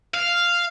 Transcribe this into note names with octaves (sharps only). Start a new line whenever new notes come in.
F5